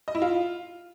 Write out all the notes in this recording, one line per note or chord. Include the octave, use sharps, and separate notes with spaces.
D#5
E4
F4